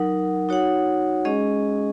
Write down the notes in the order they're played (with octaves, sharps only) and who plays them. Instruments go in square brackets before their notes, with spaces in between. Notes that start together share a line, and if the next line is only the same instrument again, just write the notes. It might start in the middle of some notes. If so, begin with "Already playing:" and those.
Already playing: [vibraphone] F#3 D#4 A#4 F#5
D#4 F#4 C#5 F#5
G#3 C#4 G#4 D#5